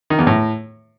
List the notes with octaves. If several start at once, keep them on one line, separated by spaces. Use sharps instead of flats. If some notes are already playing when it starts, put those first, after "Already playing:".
D#3
E2
A2